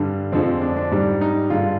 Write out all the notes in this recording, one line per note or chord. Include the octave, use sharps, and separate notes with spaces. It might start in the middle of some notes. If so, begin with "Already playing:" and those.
Already playing: G2 D3 G3
F2 D3 F3 G#3 C4
D4
D4
G#2 G3 D4
D#4
G2 D3 G#3 F4